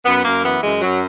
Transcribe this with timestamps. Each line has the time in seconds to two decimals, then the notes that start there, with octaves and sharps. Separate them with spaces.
0.05 F#2 B3
0.25 F#2 A#3
0.44 E3 B3
0.63 F#2 G#3
0.82 F#2 F#3